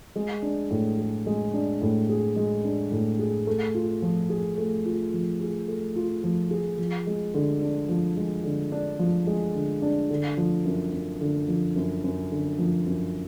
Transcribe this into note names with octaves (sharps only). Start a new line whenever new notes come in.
G#3
D4
A2
G#4
G#3
D4
A2
G#4
G#3
D4
A2
G#4
A3
F4
F3
G#4
A3
F4
F3
G#4
A3
F4
F3
G#4
F3
G#3
D3
D4
F3
G#3
D3
D4
F3
G#3
D3
D4
D3
F3
F#2
F#2
D3
F3
F#2
F#2
D3
F3
F#2